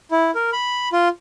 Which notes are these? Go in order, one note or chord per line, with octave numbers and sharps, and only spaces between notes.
E4
A#4
B5
F4